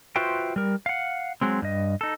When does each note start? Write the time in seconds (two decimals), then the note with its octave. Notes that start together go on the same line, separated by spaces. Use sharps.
0.16 F4 F#4 B4 C5 E5 G5
0.56 G3 A#4
0.86 F5 F#5
1.41 F#3 G#3 C4
1.62 G2 D#5
2.01 D#4 A4